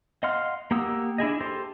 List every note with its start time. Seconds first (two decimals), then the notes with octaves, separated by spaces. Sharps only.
0.23 D#5 F5 F#5 C6 F6
0.71 A#3 G4 F#5 D#6 E6
1.18 D4 E4 G#4 D#5
1.40 G4 A4 C5